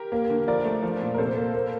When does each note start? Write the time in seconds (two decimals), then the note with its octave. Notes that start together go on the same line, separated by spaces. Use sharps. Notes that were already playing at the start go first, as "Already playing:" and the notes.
Already playing: G4 A#4
0.12 A#3
0.30 D3
0.48 F3 A#4 D5
0.65 A3
0.83 F3
1.01 A#2
1.14 A#4
1.18 C3 A4 C5
1.37 A#3
1.55 A#3